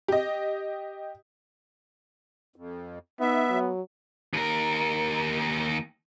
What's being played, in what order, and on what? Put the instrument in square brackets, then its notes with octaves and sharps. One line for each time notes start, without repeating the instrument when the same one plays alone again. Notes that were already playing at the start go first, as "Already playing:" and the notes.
[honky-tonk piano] G4 D#5
[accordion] F2
[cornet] B3 [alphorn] D#4 [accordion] E5
[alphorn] F#3
[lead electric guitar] D#2 A#4